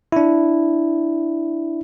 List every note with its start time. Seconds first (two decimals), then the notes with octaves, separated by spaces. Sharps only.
0.12 D4 E4